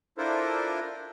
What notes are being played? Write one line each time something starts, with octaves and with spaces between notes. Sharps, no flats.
D4 E4 F4 A4 A#4 C5